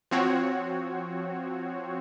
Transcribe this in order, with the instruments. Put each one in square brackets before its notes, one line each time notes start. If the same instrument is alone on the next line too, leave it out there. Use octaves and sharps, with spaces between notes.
[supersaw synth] F3 C4 F#4 C#5